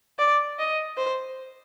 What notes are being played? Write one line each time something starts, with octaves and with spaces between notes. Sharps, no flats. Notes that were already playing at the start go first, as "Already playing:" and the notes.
D5
D#5
C5